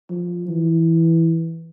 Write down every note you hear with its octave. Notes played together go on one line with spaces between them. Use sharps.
F3
E3